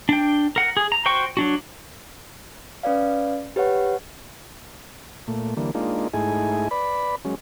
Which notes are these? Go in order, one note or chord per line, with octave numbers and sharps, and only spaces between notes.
D4 G5
A#4 F#5
G#4
A#5
F#4 C5 G5 C#6
F#3 D4 F#4
C#4 B4 D5 F5
G4 B4 C#5 F#5
A#2 A3
D3 E3 G3 A#3
G#3 A#3 D4 D#4 F4
G#2 A3 D#4 E4 G#4 G#5
B4 D5 B5
F#3 G#3 C#4